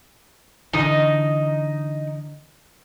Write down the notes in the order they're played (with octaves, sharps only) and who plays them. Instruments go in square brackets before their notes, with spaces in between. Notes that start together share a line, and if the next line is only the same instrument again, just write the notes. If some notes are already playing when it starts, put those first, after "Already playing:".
[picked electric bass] D3 E3 [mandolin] D#4 D#5